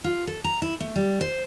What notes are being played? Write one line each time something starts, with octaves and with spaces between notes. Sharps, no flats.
F4
A4
A#5
E4
A3
G3
C5